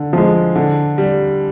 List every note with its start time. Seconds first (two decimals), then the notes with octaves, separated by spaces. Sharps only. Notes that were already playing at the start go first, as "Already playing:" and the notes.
Already playing: D3
0.13 F3 G#3
0.55 D3
0.98 G3